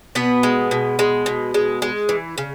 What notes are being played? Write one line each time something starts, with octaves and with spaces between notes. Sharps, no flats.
B2 B3 B4
G#3
B2
G#3
B2
G#3
G#3
E3
C#3